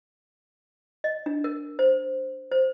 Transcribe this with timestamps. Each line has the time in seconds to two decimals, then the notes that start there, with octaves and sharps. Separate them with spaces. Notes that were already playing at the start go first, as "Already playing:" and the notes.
1.04 D#5
1.26 D4
1.44 A#4
1.79 C5
2.52 C5